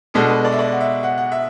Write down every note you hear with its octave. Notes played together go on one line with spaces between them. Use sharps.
B2 G#3 D4 F#4 A4
B4
D5
E5
D5
F#5
E5
F#5
F#5
E5